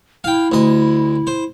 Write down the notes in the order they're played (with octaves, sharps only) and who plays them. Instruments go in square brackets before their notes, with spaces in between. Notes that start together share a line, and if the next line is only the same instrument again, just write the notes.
[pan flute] E4 [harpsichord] F5 G5
[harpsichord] D2 D#5
C5